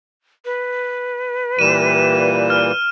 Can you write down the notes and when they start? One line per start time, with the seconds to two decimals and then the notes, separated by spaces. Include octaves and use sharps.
0.45 B4
1.59 A#2 E3 G3 D#7 E7
2.50 F6